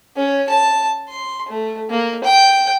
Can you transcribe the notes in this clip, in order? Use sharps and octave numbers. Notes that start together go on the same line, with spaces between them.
C#4
A5
C6
A3
A#3
G5